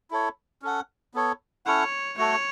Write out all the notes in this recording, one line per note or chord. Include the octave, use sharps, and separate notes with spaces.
E4 A4 C#5
C#4 A4 F#5
B3 A4 C#5
C#4 E4 A4 C#5 F#5
A3 F#4 A4 C#5